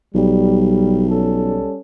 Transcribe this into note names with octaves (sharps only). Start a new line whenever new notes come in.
B1 G3
G3 C#4 A4